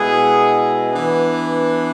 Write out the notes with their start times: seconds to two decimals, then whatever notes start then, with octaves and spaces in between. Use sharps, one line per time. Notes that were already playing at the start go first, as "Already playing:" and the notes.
Already playing: B2 G#3 B3 E4 G#4
0.93 E3 B3 D4